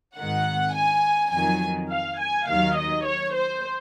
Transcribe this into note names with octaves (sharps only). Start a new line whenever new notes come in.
G#1 G#2 D#3 F#5
G#5
F2 D#3 F#3 G#5
F5
G#5
D#2 D#3 F#3 F5
D#5
C#5
C5